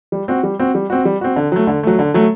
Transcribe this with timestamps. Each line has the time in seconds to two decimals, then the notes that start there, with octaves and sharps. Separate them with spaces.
0.12 G3
0.28 C4 F#4
0.43 G3
0.59 C4 F#4
0.75 G3
0.90 C4 F#4
1.05 G3
1.21 C4 F#4
1.36 D3
1.52 F#3 A3
1.67 D3
1.83 F#3 A3
1.99 D3
2.14 F#3 A3